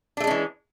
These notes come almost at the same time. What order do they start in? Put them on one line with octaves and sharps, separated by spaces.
D4 A3 G#3 C#4 E3